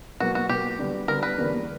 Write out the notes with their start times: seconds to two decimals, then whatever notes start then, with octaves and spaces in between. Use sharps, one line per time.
0.20 B2 F#3 A#3 F#4
0.35 F#4
0.49 B2 F#3 A#3 G4
0.79 D3 G3 B3
1.08 D3 G3 B3 A#4
1.23 B4
1.38 E2 D3 G3 A#3 C#4